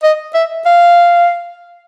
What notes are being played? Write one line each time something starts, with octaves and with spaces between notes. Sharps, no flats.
D#5
E5
F5